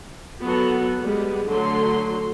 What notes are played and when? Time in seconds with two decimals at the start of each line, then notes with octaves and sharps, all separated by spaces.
0.42 F#3 B3 F#4 A4
1.00 G3 G#3 B3
1.48 D3 F#3 A3 C6